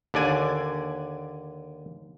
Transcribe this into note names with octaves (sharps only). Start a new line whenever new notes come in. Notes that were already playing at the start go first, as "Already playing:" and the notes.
D#2 D3 D5 G#5